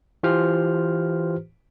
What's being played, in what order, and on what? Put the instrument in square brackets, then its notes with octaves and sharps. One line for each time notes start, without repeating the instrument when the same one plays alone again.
[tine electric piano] E3 F4 G4 B4 C5 F6